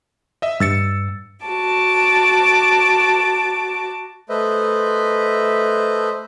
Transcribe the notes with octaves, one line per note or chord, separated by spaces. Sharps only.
D#5 E5
G2 E6 A6 C#7
F#4 A5 D6
A3 B4 C5 D#5 E5